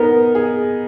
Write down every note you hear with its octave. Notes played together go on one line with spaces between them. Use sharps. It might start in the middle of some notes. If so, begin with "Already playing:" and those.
Already playing: B3 D#4 A#4
G#4